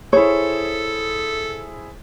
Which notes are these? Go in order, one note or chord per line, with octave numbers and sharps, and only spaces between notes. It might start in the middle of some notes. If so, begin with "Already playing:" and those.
E4 G#4 A4 C5 C#5